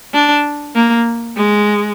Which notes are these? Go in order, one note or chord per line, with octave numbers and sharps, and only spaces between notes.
D4
A#3
G#3